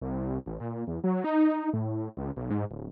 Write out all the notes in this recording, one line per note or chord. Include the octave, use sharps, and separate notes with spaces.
C2
A1
A#2
E2
F#3
D#4
A2
C#2
B1
G#2
D1